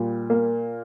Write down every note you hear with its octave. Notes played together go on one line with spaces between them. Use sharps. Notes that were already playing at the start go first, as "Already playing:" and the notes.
Already playing: A#2 G3
A#3